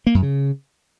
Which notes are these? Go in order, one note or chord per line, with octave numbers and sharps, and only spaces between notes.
A#3
F#2
C#3